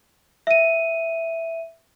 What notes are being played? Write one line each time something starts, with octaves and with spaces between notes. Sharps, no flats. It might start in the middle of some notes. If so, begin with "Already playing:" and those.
E5 D#7